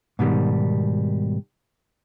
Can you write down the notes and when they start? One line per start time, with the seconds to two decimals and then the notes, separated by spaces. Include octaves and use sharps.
0.19 G#2 B2 D#3 G3